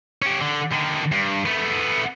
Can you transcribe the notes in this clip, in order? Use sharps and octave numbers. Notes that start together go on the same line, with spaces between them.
C#4 G4
D3
D3 D#3
G2
A3 B3